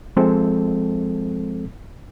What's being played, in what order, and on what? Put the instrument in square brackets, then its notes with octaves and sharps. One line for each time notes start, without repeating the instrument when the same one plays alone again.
[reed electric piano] F3 G#3 C4 A4